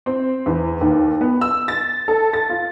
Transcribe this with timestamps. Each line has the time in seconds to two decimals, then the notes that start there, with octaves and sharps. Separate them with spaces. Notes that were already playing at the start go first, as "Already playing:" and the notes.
0.06 C4
0.46 E2
0.81 D#2
1.21 B3
1.41 E6
1.68 A6
2.08 A4
2.33 A6
2.50 F4